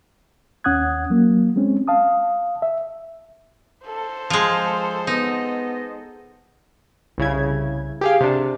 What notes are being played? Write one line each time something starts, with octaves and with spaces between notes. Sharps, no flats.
D#2 C#4 F#5 D#6 F#6 G#6
F#3 A#3
G#3 C4 C#4
F5 A5 D#6
E5
A4 C5
F3 G#3
B3 D#4 D#5
C2 C#3 E4 G#6
G4 G#4 F5
C3 D4